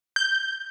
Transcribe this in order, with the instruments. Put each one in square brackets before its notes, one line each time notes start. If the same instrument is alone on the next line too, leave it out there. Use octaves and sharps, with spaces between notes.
[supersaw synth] G6